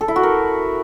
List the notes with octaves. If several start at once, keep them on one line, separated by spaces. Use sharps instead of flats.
A4
E4
F#4
A#4